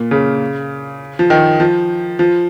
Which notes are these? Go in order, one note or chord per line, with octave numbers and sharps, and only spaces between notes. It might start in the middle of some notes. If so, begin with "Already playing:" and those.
Already playing: A#2
C#3
F3
D#3
F3
F3